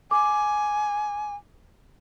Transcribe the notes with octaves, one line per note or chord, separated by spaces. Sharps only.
G#5 D6